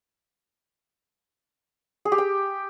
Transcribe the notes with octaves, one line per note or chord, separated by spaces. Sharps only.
G#4
G4
G5